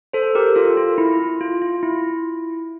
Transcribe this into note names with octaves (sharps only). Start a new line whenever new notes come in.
A4 C5
G4 A#4
F4 A4
F4
E4
E4
F4
F4
E4